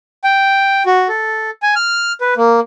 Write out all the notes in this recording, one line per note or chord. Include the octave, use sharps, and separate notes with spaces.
G5
F#4
A4
G#5
F6
B4
A#3